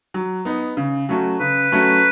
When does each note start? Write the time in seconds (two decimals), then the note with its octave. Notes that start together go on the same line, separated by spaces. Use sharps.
0.14 F#3
0.45 B3 D#4
0.77 C#3
1.09 F#3 A3 C#4 F#4
1.40 C#3 B4
1.72 F#3 A3 C#4 F#4